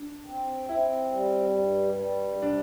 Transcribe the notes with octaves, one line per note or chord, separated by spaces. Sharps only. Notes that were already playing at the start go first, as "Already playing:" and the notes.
Already playing: D4
C4
C4 E4
G3
G2
G3
C3 D4